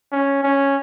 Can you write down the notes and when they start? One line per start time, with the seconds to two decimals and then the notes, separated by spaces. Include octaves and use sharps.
0.12 C#4
0.43 C#4